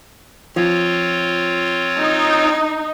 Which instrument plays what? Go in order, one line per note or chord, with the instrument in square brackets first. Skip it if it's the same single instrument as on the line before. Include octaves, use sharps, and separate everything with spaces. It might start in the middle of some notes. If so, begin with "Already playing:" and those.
[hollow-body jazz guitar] F3 [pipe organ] C4 F4 C#5
[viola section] D#4